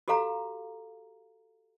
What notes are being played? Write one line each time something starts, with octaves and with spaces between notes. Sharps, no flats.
F#4 G4 A4 F5 A#5